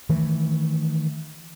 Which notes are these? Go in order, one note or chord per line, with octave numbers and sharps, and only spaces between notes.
D#3 E3 A3